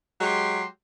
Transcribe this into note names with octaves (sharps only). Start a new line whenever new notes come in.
F#3 G#3 G4 C6